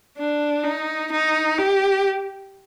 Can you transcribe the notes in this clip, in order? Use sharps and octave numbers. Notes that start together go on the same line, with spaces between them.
D4
D#4
D#4
G4